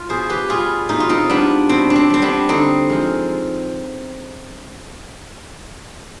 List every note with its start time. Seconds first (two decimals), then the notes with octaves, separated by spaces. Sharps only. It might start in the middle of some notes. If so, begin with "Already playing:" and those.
Already playing: F4
0.09 B2 G#4 C5
0.29 G4 B4
0.49 G3 F4 G#4
0.89 B2 D#4
1.00 F4
1.09 C4 D#4
1.29 G3 B3 D4
1.69 B2 C4
1.90 D4
1.96 C4
2.10 G3 C4
2.22 B3 D4
2.49 D3 C4 D#4
2.90 F3 G#3